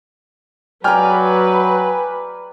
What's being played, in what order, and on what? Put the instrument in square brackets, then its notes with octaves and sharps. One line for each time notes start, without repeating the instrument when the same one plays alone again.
[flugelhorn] F#3 [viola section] B4 [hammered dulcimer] D5 A#5 [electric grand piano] G5 G#5 F6